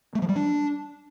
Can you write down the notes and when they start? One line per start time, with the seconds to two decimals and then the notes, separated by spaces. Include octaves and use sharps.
0.15 A3
0.22 F3
0.29 G3
0.36 D4